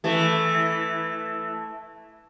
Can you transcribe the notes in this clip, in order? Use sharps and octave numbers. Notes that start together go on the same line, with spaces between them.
E3 A3